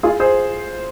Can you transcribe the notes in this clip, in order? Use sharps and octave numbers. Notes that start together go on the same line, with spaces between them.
F4 G#4
G#4 C5